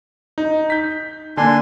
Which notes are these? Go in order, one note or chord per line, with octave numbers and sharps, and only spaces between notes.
D#4
G6 B6
D3 A#3 D4 G#5 C6